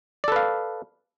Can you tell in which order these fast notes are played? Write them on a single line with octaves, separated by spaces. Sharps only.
D5 A4 B4 F5